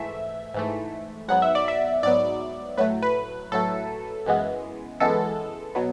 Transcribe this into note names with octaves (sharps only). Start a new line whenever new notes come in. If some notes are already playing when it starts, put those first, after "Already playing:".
Already playing: G#2 E3 A3 E5
G#2 E3 A3
G#2 F#3 B3 F#5
E5
D5
E5
G#2 F#3 B3 D5
A2 F#3 A3 B4
B4
A2 F#3 A3 A4
F#2 E3 G#3 B3
F#2 E3 G#3 B3 A4
B2 F#3 B3